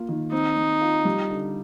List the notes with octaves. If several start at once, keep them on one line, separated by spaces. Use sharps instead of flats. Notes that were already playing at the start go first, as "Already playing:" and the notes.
Already playing: A#3 F4
D#3
C4 D#4
C4
F4
G3
D3